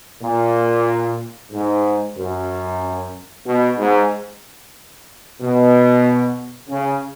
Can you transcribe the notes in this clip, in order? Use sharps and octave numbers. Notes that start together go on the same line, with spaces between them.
A#2
G#2
F#2
B2
G#2
B2
C#3